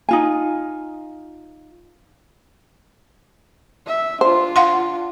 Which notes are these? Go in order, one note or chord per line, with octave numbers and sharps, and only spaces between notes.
D#4 F4 G#5
E5
D4 F4 C5
F5 F#5 C6